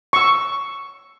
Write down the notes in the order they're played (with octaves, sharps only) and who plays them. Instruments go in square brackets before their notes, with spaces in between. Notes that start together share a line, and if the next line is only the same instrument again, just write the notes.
[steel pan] C#6 E6